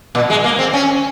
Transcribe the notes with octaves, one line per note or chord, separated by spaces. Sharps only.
A#2
G#3
A#3
C4
C#4